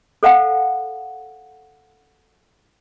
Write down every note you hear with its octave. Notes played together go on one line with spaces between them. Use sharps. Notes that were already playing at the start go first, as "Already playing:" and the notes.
A4 C5 F5 F#5 A5